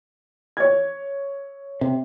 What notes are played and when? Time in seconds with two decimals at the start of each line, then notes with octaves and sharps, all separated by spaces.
0.57 C#5 G#6
1.81 C3